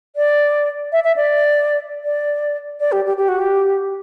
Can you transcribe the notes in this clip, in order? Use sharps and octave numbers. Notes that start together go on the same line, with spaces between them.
D5
E5
E5
D5
D5
D5
G4
G4
G4
F#4
G4